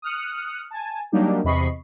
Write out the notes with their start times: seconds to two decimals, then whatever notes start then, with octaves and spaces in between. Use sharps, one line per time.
0.02 D#6 F6 F#6 C#7
0.71 G#5 A5
1.12 F#3 G3 A#3 D4 D#4 G4
1.44 E2 C3 D#5 B5 C#6 C7